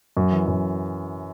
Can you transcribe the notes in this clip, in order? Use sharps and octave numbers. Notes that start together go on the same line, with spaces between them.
F#2
E3
F#2